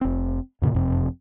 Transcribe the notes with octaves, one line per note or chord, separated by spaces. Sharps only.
F1 C4
F2 A#2 C#3 A#3
F#1 F2 C3 C4